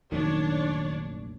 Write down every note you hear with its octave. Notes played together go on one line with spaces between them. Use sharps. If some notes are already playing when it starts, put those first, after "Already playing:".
F1 A#1 F#2 D#3 D4 C#5